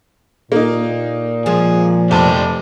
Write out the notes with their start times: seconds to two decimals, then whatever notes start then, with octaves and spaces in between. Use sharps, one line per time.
0.52 A#2 A#3 D#4
1.46 F3 G#3 G#4
2.11 F1 C4 D4 G4 A5